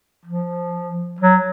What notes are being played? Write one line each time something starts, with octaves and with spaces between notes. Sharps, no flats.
F3
F#3